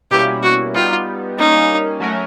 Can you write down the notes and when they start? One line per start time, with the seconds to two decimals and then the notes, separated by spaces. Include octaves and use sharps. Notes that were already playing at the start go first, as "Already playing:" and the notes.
0.11 B2 G3 A#3 C#4 E4 G4
0.43 F#4
0.74 G3 B3 D#4 F4 G4
1.37 G3 A#3 C#4 D#4
2.00 F#3 A3 C#4 F#4 A#4